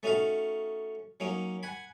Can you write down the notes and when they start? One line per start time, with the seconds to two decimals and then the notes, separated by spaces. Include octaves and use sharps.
0.03 A3 C#4 D#4 F#4 F5 A#5
1.20 F#3 A#3 C#4 D#4
1.63 F#5 G#5 B5